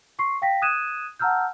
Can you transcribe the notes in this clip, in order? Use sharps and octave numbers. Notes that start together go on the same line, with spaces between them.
C6 C#6 C7
F5 G5 A#6 B6
D#6 F#6 G#6 D#7 E7
F#5 A5 A#5 E6 F6 G6